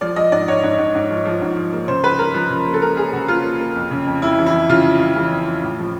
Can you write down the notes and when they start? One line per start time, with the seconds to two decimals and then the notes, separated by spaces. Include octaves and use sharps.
0.01 F3 D5
0.16 F3 D#5
0.32 G#2 D5
0.48 G#2 C#5
0.63 G#2
0.78 G#2
0.95 G#2
1.10 F3
1.25 F3
1.41 G#2
1.56 F3
1.73 A#3
1.88 C#3 C5
2.04 F3 B4
2.19 F3 A#4
2.34 F3
2.50 C#3
2.67 A#3
2.74 A4
2.82 A#3 A#4
2.97 A#3 G#4
3.13 C#3 F#4
3.28 A#3 F4
3.44 A#3
3.60 A#3
3.75 F2
3.91 C#3
4.07 F2
4.22 F2 E4
4.38 E3
4.46 E4
4.53 F2
4.69 C#3 F4
4.85 F2
5.00 F2
5.16 E3
5.32 F2
5.47 F2
5.62 A2
5.78 F3